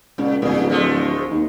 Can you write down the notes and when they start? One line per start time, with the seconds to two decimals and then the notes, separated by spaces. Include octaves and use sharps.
0.18 C#2 A#2
0.42 D1 A#2 G#4
0.70 F3 G#3 A3
1.31 D#2